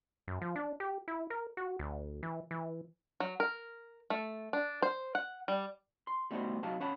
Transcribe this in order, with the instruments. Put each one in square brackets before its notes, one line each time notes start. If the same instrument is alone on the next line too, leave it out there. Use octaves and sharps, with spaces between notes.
[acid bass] F#2
F3
D4
G4
E4
A#4
F#4
D2
E3
E3
[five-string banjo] F#3
A#4
A3
D4
C5
F#5
G3
[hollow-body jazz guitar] C6
G3 A3 B3 D#4 F#4 C5
C3 F#3 D#4 F#4 F5 A5
C#4 C#5 F#5 A5 B5